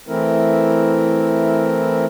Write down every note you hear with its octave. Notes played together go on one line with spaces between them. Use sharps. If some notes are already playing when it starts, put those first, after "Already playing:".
E3 A3 C4 E4 A#4